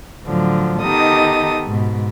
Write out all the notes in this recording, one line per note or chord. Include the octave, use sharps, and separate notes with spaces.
A2 D3 F3 F#3
D#3 B3 D#4 G4 A4 D#6
G#2 B2